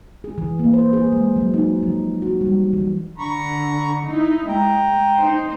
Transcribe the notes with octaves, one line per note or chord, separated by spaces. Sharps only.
G#4
E3
A#3
C5
G#4
G#3
F#3
D#4
F3
F#4
G3
E3
D3 A#5 B5 C#6
D#4 E4
G#3 G5 A#5
D#4 C5